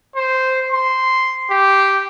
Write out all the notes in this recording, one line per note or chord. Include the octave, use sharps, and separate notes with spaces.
C5
C6
G4